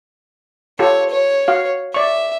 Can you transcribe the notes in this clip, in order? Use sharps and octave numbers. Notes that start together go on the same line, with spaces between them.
F4 G4 A4 C#5
C#5
F#4 F5
D5 E5 C#6